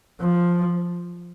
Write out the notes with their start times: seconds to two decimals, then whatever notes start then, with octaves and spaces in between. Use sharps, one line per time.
0.20 F3